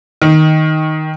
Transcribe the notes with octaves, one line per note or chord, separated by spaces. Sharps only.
D#3